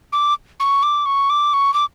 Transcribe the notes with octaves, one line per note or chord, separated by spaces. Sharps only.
D6
C#6
D6
C#6
D6
C#6
D6